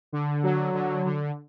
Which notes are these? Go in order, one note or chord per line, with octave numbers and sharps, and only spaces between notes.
D3
F#3
D3
D3